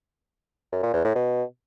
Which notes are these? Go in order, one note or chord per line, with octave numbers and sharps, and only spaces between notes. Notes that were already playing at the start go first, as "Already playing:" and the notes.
F#2
A#2
E2
A2
B2